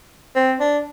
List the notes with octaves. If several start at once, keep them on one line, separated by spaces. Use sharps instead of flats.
C4
D4